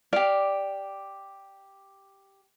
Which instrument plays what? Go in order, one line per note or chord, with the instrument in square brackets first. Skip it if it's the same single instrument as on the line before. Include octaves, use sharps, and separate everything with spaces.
[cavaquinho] G4 F5 [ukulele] D5